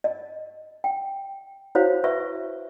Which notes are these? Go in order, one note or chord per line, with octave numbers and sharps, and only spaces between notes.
D#5
G5
E4 F#4 C5 C#5 F5
B4 E5 C#6